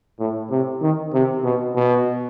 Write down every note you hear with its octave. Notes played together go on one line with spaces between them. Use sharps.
A2
C3
D#3
C3
B2
B2